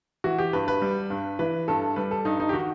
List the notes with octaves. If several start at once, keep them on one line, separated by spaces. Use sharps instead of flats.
E3 F#4
G4
G2 B4
B4
G3
G2
E3 B4
G2 A4
G3 B4
A4
G2 D#4
D#4
G4
D#3 F#4